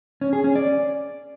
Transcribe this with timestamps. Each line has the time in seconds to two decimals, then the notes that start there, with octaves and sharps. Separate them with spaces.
0.21 C#4
0.33 G#4
0.44 C#4
0.55 D5